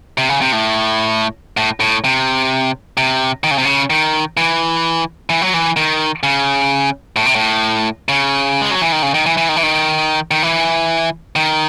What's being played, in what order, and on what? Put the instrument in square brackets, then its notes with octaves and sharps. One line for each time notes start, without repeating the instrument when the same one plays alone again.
[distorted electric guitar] C3
C#3
C3
A2
A2
A2
C3
C3
D#3
C#3
C3
C#3
D#3
E3
E3
F#3
E3
D#3
C#3
A2
C3
A2
C#3
G#3
F#3
E3
D#3
C#3
D#3
E3
E3
D#3
E3
D#3
D#3
E3
D#3